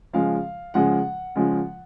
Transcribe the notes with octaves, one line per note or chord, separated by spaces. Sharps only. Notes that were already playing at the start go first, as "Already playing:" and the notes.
C#3 F3 G#3 F5
C#3 F3 G#3 F#5
C#3 F3 G#3